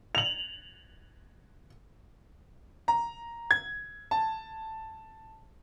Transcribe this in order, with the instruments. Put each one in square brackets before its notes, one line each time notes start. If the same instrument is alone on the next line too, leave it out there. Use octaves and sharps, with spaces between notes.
[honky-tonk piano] F7 F#7
[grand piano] A#5
G#6
A5